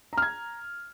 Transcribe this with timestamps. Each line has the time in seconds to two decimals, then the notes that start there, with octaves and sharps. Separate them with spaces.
0.13 A#5
0.18 F6
0.22 G#6